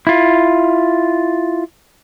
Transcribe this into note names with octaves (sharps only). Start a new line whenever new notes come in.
E4 F4